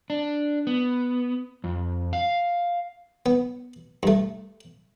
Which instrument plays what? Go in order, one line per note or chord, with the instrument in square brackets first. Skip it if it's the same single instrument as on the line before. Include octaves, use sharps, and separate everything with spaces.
[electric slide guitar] D4
B3
F2
F5
[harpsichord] B3
G2 A3